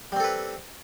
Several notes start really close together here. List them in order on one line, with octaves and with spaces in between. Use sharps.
G3 C4 A4 B4